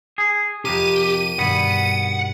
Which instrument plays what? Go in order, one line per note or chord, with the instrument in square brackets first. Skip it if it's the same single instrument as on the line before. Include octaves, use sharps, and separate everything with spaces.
[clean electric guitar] G#4
[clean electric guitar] F2 G#2 C3 [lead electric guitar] G4 [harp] A#4 G5 [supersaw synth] D#7
[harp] G2 B2 D#3 [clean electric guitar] B3 [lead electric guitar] F#5